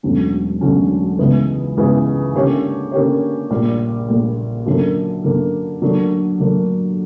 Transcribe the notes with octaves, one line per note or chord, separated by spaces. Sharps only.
E1 D2 D3 F#3 C#4
E1 D2 D3 F#3 C#4
C#2 C#3 E3 B3
C#2 C#3 E3 B3
D3 A#3 C#4 G4 C#5
D3 A#3 C#4 G4 C#5
A#1 A#2 G3
A#1 A#2 G3
F#2 D3 A#3
F#2 D3 A#3
D2 D3 F#3 A#3 D4
D2 D3 F#3 A#3 D4